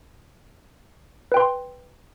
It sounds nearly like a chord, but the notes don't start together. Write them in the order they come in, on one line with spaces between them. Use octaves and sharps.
B4 G5 C6